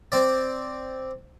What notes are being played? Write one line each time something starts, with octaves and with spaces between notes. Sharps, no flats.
C4 D5